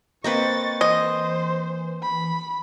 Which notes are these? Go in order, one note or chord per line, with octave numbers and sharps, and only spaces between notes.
A#3 C4 B4 D#5 C#6 A6
E3 C5 D#5
B5